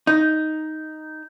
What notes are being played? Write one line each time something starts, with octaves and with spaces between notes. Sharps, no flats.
D#4